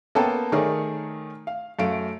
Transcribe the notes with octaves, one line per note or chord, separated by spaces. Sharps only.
A#3 B3 C#4 A4 G5 A5
D#3 A3 G#4 A#4 C#5 D5
F5
F#2 A3 F5 D7